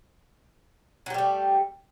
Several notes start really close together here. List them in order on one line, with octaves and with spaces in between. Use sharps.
F#3 G4 G3 A3